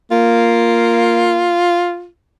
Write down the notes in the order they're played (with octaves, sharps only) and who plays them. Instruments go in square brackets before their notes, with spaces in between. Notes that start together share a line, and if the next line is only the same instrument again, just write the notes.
[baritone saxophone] A#3 [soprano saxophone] F4